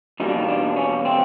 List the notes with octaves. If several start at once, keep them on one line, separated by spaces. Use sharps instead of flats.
E2 B2 G3 A#3 D#4
D4
D#4
D4
C#4
C4